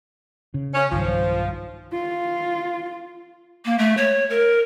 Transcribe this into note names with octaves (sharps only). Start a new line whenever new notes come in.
C#3
C#4
B1 G2 D#3 F3
F4
A#3
A3
C#5
A#4